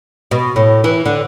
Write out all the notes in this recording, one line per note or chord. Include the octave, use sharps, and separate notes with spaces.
B2
A2
E3
D3